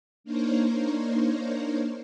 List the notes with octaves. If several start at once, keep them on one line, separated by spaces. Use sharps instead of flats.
A#3 D4 D#4 A#4 C5 C#5